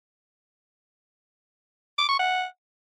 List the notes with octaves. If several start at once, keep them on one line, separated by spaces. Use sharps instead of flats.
D6
C#6
F#5